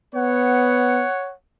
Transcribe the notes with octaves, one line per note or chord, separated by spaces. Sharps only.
B3 C#5 F#5